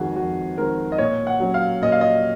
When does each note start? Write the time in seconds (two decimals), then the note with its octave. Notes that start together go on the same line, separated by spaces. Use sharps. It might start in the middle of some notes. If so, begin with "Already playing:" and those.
Already playing: F2 D#3 G#3 C4 F#4 G#4
0.16 F2 F#4
0.57 D#3 G#3 C4 A#4
0.92 D#5
0.98 A#2 C#5
1.27 F#5
1.40 F#3 C#4
1.54 F5
1.82 A#2 D#5
1.92 F5
2.01 D#5